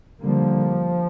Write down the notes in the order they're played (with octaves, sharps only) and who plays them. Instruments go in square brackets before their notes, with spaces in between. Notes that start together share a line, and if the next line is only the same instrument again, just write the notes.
[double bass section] D3 G3 A#3 [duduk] F3